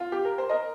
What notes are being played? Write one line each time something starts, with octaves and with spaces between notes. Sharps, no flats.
F4
G4
A#4
C5
A#4 D#5